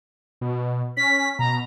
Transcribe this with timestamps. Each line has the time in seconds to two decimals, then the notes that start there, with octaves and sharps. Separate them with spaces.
0.41 B2
0.97 C#4 B6
1.39 B2 A#5